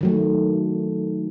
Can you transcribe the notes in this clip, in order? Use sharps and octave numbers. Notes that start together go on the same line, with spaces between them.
D#3 F#3 A3